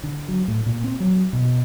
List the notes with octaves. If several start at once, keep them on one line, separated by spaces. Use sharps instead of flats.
D3
F#3
A2
A#2
C4
F#3
B2